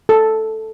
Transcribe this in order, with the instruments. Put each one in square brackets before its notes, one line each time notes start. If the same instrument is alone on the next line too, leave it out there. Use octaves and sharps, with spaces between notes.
[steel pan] A4